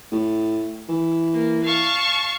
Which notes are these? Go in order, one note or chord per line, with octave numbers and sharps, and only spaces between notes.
A2
E3
A#3
F5 A5 C#6